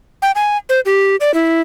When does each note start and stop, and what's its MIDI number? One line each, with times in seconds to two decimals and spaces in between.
0.22 0.32 79
0.35 0.57 80
0.69 0.80 72
0.85 1.16 67
1.20 1.33 74
1.34 1.61 64